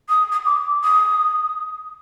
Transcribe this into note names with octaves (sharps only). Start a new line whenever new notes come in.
D#6
D#6
D6
D#6